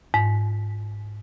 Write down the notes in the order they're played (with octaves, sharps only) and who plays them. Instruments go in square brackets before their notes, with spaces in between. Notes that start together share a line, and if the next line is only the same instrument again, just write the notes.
[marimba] G#2